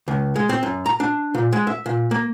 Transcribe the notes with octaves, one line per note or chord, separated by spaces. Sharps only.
C#2
G#3
C4
F#2
A#5
D4
A#2
G#3
E5
A#2
A#3